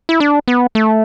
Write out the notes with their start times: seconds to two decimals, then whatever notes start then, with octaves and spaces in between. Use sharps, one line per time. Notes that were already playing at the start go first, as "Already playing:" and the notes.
0.09 E4
0.20 D4
0.48 B3
0.75 A3